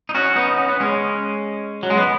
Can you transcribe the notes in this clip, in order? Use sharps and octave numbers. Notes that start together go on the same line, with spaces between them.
D#4
C#4 F#4
B3 D#4
C#4
B3
G#3 C#4
F#3
G#3
B3